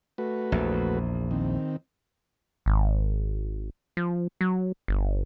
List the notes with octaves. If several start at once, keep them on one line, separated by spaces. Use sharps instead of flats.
A3 F#4 B4
A#1 E2
D#3 C4
G#1
F3
F#3
G1